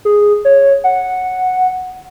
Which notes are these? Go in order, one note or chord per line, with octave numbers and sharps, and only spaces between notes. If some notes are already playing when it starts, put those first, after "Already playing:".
G#4
C#5
F#5